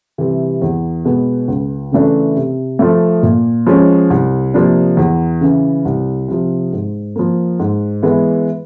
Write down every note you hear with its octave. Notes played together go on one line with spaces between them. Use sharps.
C3 E3 G3
E2
B2 G#3 B3
C#2
C#3 E3 A3 D4
C3
F3 A3
A#2
F3 G#3 C#4
C2
C3 F3 A#3 D4
E2
C#3 E3
C2
C3 F3
G#2
F3 A#3
G#2
E3 G#3 B3